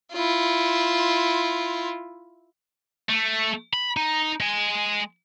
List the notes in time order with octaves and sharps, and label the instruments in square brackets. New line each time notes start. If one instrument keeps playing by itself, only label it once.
[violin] E4 F4
[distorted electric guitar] A3
B5
D#4
G#3 G#5